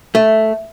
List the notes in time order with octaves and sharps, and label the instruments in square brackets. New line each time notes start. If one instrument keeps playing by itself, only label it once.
[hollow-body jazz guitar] A3